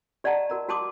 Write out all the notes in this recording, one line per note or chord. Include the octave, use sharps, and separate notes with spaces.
G4 D5 D#5 F#5 A5 A#5
F#4 A#4 A#5
F#4 G4 A5 C6 D6 D#6